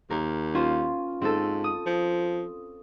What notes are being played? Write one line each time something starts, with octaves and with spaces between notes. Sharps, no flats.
D#2 A#4
C#4 F4 C5
G#2 C4 A4
D#6
F3